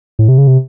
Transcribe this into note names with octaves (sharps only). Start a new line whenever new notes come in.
A2
C3
C#3
C3